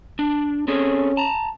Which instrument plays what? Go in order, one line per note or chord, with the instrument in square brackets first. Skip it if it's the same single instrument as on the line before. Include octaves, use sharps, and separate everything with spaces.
[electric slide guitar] D4
[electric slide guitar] C4 G#4 A4 [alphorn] C#4
[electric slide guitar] A5 A#5